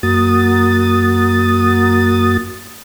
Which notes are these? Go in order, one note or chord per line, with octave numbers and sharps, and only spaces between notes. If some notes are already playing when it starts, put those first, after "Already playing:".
F#2 A#3 F#4 D#6 A6